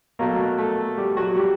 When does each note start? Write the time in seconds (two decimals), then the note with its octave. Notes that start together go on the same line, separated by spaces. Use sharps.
0.19 B2 F#3 A3 A#3 A#4
0.58 A3 A4
0.97 G3 G4
1.17 F#3 F#4
1.36 G3 G4